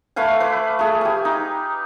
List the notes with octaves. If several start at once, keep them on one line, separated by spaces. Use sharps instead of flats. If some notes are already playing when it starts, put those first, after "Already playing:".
A3 B4 F5 G#5
B4 D6
A3 G#4
G4 G#5
D#4